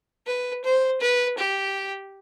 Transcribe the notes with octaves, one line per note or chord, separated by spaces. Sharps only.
B4
C5
B4
G4